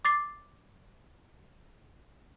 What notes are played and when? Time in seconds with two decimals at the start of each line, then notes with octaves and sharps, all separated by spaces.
0.05 D6 A6 C7